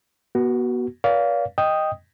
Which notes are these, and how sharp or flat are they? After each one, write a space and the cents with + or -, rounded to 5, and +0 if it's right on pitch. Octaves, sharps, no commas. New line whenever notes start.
B3 -35 F#4 +15
B4 -40 D5 -45 F5 +5
D#5 +0 G5 +0 D#6 +0